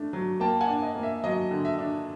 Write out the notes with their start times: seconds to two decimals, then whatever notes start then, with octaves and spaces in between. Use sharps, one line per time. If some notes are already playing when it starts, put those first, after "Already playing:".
Already playing: A3 D4
0.13 F#3
0.40 A#3 G5 A5
0.61 F#5 G#5
0.68 D4
0.82 D#5
0.95 A#3
1.03 E5
1.24 F#3 D#5
1.51 D3
1.65 E5
1.78 D4